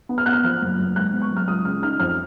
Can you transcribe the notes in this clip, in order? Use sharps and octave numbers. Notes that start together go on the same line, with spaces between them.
B3
F6
B3 F#6
F6
F3 F6
F#1
F#1
G#2 F#6
B3
C#6
F#3
F6
C#2 D#6
C#3 F6
D#4 F6
F2 F6